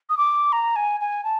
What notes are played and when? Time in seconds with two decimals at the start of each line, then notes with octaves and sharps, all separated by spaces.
0.09 D#6
0.17 D6
0.52 A#5
0.76 G#5
1.00 G#5
1.24 A5